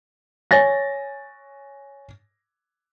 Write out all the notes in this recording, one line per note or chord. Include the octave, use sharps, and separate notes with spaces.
C#5 G#5 A6 A#6